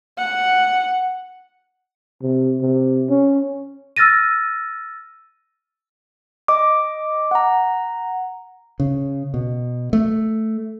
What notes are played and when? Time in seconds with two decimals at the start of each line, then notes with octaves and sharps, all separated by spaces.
0.18 F#5
2.22 C3
2.62 C3
3.09 C#4
3.96 E6 F6 A6 A#6 D#7
6.48 D#5 D6
7.31 F#5 A#5
8.80 C#3
9.34 B2
9.93 A3